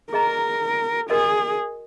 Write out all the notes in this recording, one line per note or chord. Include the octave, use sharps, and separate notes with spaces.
G#4 A#4 D#5 A#5
F#4 G#4 A#4 D#5